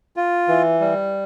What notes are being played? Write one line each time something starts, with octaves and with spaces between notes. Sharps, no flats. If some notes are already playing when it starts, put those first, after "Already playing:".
F4
E3
G3